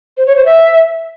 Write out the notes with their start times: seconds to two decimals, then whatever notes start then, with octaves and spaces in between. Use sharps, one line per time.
0.17 C5
0.27 C#5
0.36 C5
0.45 E5